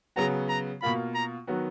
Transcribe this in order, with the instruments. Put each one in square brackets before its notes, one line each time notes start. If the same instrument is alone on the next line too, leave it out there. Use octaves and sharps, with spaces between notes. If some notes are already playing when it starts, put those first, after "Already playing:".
[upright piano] C#3 F#3 B3 F#4 [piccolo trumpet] A#5
[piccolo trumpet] A#5
[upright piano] B2 A#3 F4 [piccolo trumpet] B5
[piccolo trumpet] A#5
[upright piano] D#3 F#3 B3 F#4